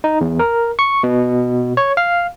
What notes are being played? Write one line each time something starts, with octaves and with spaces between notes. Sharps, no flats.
D#4
E2
A#4
C#6
B2
C#5
F5